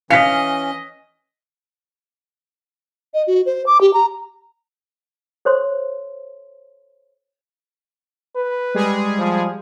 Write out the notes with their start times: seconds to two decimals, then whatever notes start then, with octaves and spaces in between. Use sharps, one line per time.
0.10 E3 C#4 D#5 F5 B6 C#7
3.14 D#5
3.27 F#4
3.46 C5
3.66 D6
3.81 G4
3.94 A#5
5.45 A4 C5 C#5 C6
8.36 B4
8.75 G3 G#3 G#4
9.18 F3